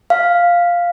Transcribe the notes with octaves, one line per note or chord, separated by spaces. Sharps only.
F5